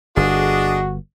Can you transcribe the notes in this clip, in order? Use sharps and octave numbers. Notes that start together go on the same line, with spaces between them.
G1 D4 F#4 G#4 D#5